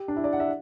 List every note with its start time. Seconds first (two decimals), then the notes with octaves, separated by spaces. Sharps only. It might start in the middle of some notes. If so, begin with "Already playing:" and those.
Already playing: G4
0.08 D4
0.16 E4
0.24 D5
0.33 F#5
0.40 E5